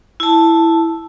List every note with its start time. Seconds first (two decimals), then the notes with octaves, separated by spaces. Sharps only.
0.20 E4 A5